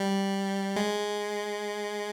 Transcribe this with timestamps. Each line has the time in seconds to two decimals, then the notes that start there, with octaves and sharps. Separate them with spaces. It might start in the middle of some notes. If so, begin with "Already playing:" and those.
Already playing: G3
0.76 G#3